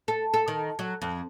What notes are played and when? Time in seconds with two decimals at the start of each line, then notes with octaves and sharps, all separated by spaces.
0.08 A4
0.34 A4
0.48 D#3
0.79 F#3
1.02 F2